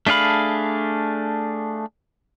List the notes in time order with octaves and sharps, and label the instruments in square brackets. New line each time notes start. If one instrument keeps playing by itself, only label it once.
[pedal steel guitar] A3 D4 G#4 F5 B5